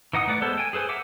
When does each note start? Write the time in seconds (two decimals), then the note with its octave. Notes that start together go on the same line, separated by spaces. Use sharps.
0.13 E3 D#4 F#5 D#6
0.27 A3 B4 D5 F#5
0.42 G#3 B3 A4 C5 A5
0.58 G5 G#5
0.73 G#4 A4 B4 C5 G#5
0.89 A#4 E5 F#5 D6